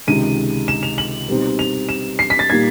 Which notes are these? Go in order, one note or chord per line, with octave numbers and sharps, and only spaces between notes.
C#2 C3 D#3 G#3 D#7
E7
F7
F#7
B2 G3 C4 D#4
F7
E7
C7
B6
A6
A#2 G3 A#3 D#4 G#6